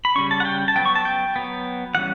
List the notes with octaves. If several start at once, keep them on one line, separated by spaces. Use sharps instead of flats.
B5
C#3 G3 C#4 C#6
A5
F#5
G5
A5
F#3 B3 G5
C#6
A5
G5
F#3 B3
E3 G3 C#4 F#5